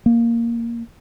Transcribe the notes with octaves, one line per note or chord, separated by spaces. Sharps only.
A#3